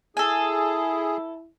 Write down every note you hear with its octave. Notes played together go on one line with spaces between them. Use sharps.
E4 G#4 A4 G#5